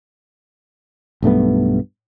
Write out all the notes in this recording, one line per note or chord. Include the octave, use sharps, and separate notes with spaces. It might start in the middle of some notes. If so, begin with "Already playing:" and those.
B1 G2 A3 B3